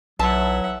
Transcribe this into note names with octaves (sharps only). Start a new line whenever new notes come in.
B1 E3 F#3 E5 F#5 A5